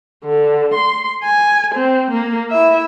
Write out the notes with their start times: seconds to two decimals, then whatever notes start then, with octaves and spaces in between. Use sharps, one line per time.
0.24 D3
0.74 C6
1.23 G#5
1.75 C4
2.11 A#3
2.51 E4 E5